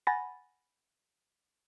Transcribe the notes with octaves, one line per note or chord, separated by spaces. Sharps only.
F#5 G#5 B5 A6 A#6